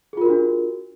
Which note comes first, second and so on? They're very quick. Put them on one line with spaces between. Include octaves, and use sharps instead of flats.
G#4 F4 A#4 F#4 D4